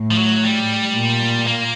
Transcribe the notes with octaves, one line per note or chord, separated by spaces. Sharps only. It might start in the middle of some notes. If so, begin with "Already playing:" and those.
Already playing: A2
F3
F#3
G3
A#2
A#3